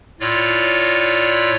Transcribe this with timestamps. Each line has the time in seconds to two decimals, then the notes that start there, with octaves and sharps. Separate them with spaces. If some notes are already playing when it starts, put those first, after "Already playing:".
0.20 A2 F4 C#5 D5